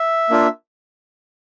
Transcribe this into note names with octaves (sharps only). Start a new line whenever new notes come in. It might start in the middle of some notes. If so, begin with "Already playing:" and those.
Already playing: E5
A#3 D4 F4